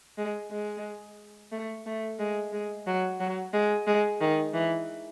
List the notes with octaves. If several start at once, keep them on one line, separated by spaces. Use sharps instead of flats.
G#3
G#3
A3
A3
G#3
G#3
F#3
F#3
G#3
G#3
D#3
E3